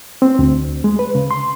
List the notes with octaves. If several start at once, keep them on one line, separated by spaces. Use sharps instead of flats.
C4
D2
G#3
B4
C#3
C6